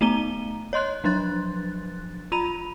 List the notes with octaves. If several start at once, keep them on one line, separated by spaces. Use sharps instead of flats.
A3 B3 D#4 A#5 D#7 G7
C#5 D#5 C6 F#6
F3 F#3 D4 C6 F#6 A6
F4 A#5 B5 D#7 F7